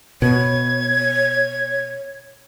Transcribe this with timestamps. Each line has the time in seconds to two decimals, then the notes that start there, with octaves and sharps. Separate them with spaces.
0.22 B2 C#5 G#6